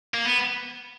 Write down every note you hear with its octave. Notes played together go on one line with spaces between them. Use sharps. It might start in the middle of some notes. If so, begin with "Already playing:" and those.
A#3
B3